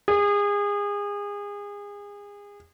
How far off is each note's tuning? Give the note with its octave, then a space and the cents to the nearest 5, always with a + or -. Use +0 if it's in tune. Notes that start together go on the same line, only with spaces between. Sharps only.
G#4 -30